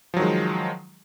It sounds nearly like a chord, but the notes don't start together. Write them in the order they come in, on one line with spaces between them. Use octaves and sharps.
F3 F#3 D#3 G#3